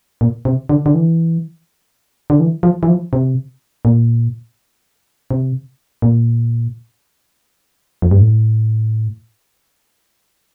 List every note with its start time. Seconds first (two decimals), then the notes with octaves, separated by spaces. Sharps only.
0.21 A#2
0.45 C3
0.69 D3
0.86 D3
0.94 E3
2.30 D3
2.40 E3
2.63 F3
2.83 E3
2.88 F3
3.13 C3
3.85 A#2
5.31 C3
6.02 A#2
8.02 F2
8.11 G2
8.21 A2